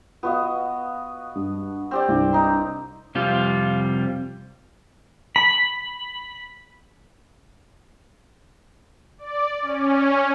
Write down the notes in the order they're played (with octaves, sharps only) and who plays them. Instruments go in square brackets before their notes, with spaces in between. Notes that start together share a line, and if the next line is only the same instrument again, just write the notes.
[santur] B3 F#4 D#5 [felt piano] F4 B4 F5
[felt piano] G2
[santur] C4 G4 D5
[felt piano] C2 G2
[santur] D#4 A#5 C6
[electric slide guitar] F2 C3 G3 C4 F4
[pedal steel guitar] B5
[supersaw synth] D5
C#4